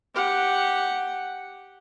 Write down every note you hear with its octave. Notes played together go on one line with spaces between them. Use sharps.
G4 F#5